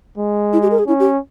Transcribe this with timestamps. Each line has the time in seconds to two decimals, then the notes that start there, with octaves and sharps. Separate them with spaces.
0.18 G#3
0.53 E4
0.62 G4
0.71 A#4
0.79 G#4
0.87 C#4 E4
1.00 G4